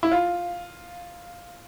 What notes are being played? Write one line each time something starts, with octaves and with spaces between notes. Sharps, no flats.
E4
F4